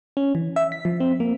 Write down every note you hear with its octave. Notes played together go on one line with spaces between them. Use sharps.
C#4
E3
E5
B6
F3
C4
A#3